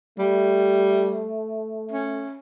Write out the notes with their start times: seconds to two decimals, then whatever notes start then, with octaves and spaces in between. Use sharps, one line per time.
0.18 G3 A3
1.91 C#4